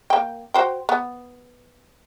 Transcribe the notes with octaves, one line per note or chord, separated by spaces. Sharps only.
A#3 G5
F#4 C5 G5
B3